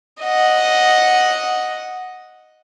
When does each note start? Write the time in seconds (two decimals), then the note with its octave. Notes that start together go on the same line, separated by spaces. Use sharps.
0.22 D#5 F#5